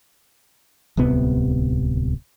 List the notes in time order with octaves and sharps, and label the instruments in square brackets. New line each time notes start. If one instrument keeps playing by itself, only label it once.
[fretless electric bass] D1 C2 C3 B3